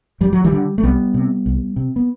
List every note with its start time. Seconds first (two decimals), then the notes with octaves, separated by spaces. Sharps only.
0.21 F#2 G3
0.33 F#3
0.44 E3 G3
0.52 D3
0.78 A3
0.83 C2 G3 B3
1.14 C3
1.46 C2
1.76 C3
1.96 B3